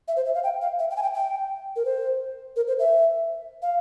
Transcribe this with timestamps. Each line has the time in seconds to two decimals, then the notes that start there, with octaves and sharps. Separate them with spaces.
0.08 E5
0.16 C5
0.25 E5
0.35 F5
0.43 G5
0.61 F5
0.79 E5
0.91 G5
0.96 G#5
1.03 G5
1.14 G5
1.76 A#4
1.85 C5
2.56 A#4
2.68 C5
2.79 E5
3.62 F5